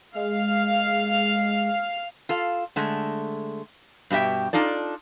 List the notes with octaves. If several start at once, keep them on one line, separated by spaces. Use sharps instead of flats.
G#3 F5
F4 A4 F5
D3 G#3 A3
G2 B2 G4 E5 G5
D4 D#4 F4 A4 D5